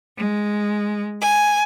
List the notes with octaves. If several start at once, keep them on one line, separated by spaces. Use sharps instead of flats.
G#3
G#5